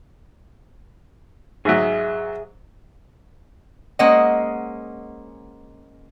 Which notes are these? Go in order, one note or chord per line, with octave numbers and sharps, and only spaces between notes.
G#2 F#3 G#4 D#5 E5
G#3 A#3 C#4 C5 D#5 F#5